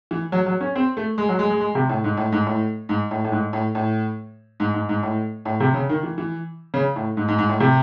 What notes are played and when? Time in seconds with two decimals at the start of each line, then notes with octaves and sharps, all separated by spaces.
0.11 E3
0.32 F#3
0.46 F#3
0.61 C#4
0.75 C4
0.97 A3
1.18 G#3
1.29 F#3
1.39 G#3
1.50 G#3
1.61 G#3
1.75 C3
1.89 A2
2.04 G#2
2.17 A2
2.32 G#2
2.47 A2
2.89 G#2
3.11 A2
3.24 A2
3.32 G#2
3.53 A2
3.75 A2
4.60 G#2
4.74 G#2
4.89 G#2
5.03 A2
5.45 A2
5.60 C3
5.74 C#3
5.89 D#3
6.03 E3
6.18 E3
6.74 C#3
6.96 A2
7.17 G#2
7.28 G#2
7.38 G#2
7.49 A2
7.60 C3